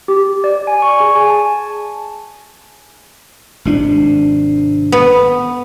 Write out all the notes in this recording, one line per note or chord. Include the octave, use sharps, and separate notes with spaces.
G4
D5
G#5
C#6
G#4
G#5
A5
G#1 C3 D4
B3